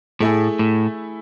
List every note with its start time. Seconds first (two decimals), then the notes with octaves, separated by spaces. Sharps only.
0.20 A2 A3 E4 G#4
0.59 A2